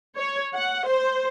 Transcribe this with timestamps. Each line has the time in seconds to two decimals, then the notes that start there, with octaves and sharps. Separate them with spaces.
0.17 C#5
0.55 F#5
0.88 C5